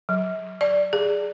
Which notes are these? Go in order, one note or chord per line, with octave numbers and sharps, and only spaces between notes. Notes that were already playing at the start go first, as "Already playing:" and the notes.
F#3
D5
G#4